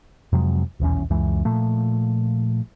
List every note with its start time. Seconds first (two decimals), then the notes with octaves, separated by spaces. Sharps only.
0.32 F2 C3 F#3 G#3
0.80 D#1 B1 E2 C#4
1.10 C#2 F#2 E3 G#3
1.45 A#2 F3 A3